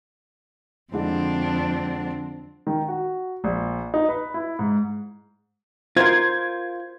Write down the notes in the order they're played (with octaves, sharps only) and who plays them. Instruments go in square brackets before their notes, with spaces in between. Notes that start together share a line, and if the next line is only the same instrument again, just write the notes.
[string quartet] F2 C4 D4 [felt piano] D3 G#3 E4
[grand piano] D#3
F#4
A#1
D#4
B4
E4
G#2
[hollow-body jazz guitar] F4 A#4 [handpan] C5 [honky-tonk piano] G#6